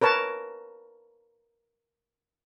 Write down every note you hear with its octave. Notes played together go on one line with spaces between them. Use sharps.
A#4 B4 C#5 A5